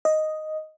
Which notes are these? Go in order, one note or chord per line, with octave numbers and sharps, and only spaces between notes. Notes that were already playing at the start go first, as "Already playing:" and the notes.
D#5